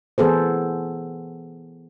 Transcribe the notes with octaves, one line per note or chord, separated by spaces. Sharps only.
E3 B3 G#4 A4 C5